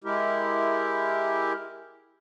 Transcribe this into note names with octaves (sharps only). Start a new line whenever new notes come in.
G#3 E4 G4 A#4